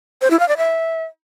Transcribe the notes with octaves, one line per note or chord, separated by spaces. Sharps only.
C5
E4
F5
D5
E5